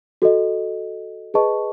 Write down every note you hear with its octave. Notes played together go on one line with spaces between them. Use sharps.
F#4 A4 D#5
G#4 B4 D#5 A5 C#6